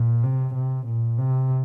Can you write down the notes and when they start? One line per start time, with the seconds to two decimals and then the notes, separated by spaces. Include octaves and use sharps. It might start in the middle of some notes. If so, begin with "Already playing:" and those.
Already playing: A#2
0.23 C3
0.54 C3
0.87 A#2
1.18 C3